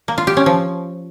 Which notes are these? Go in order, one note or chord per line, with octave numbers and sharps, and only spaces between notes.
A#3
F4
G4
C#4
F3